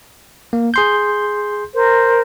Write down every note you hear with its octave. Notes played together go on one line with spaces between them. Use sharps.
A#3
G#4 C6 G6
A#4 C5